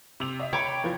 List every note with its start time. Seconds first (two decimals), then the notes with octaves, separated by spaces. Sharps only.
0.20 C3 F7
0.40 D#5 E5
0.53 C#5 G5 A#5 B5 D6
0.83 E2 E3 F3